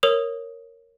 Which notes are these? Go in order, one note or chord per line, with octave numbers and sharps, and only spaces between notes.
A#4 C#5 D#6 F7